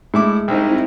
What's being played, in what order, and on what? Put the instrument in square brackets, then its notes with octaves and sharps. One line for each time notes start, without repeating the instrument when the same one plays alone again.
[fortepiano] A2 E4 D6 [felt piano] G#3
[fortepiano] C2 [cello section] C4 D#4 E4